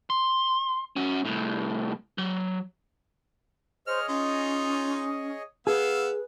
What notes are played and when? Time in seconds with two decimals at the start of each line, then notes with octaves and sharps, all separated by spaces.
0.10 C6
0.96 C#4 F#4
1.25 C2 A2
2.18 F#3
3.87 G#4 C5 C#5 D#5 F6
4.08 C#4 D#4 F4
5.67 B3 G#4 B4 F5 E6